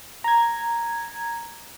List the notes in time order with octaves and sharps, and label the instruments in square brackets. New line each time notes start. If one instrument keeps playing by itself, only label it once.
[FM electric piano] A#5 G#6